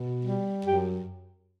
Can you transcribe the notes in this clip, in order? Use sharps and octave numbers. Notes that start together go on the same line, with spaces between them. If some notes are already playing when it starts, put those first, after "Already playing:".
Already playing: B2
G3
F#2 G4